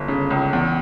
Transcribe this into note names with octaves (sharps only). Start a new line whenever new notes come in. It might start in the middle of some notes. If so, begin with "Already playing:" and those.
Already playing: G1
C#3
C#2
E2